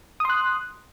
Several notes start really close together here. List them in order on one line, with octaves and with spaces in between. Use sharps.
D#6 C6 F#6